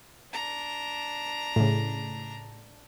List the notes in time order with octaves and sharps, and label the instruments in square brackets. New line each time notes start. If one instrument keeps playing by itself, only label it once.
[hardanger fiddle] D4 A#5
[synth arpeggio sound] A2 C#3